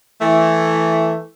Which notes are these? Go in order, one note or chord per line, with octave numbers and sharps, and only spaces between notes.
E3 A3